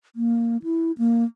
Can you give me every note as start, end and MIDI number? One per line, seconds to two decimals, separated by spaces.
0.16 0.57 58
0.64 0.92 64
0.98 1.24 58